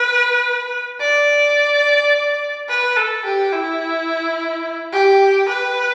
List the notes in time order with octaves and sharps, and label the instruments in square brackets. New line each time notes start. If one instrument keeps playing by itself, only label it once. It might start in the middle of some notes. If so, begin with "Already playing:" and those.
Already playing: [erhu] B4
D5
B4
A4
G4
E4
G4
B4